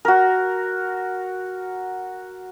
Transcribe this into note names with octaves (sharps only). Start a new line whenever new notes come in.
F#4 A#4